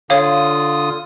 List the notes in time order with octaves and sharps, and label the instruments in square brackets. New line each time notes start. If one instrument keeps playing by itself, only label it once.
[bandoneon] D3 F4 D#6 [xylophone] C#5 F5